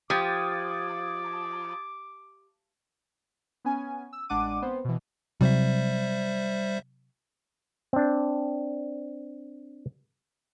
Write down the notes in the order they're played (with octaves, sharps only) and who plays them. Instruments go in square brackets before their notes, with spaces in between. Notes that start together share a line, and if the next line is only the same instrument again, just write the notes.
[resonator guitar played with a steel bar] F3 [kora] G4 [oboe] D6 [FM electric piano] D#6 G#6 A6
[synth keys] B3 C#4 G#5
E6
A1 G#3 D4 F#5 D6 D#7
B3 C4 C5
B2 E3
[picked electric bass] C3 F#3 [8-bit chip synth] G3 C5 E5
[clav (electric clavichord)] C4 D4